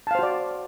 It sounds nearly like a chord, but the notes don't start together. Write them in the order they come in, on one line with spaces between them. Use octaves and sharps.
A5 F5 C5 F#4 D5